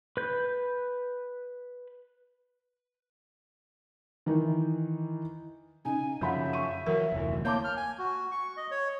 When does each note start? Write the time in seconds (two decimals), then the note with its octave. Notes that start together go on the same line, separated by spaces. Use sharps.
0.17 B4 G6
4.26 D#3 E3 D#4
5.85 C#3 D#4 G#5
6.21 F#2 C#3 F3 E5 F#5 B5 G6
6.53 C#6 D#7
6.86 E3 F#3 A#4
7.12 F1 D2 E3
7.45 A#3 C#5 A5 D6 G6
7.64 F6
7.77 G#5
7.99 F#4
8.31 C#6
8.57 D#5
8.71 C#5